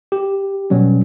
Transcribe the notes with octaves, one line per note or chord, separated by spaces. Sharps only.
G4
B2 F#3 G3 C#4